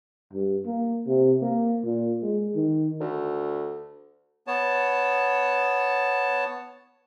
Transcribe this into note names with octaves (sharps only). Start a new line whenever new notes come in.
G2
A#3
C3
A#3
A#2
G#3
D#3
D2
B3 C#5 A5